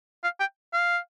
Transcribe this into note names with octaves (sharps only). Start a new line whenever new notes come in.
F5
G5
F5